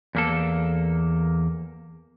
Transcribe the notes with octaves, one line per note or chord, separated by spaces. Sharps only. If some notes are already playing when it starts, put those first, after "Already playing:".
E2 A#3 A4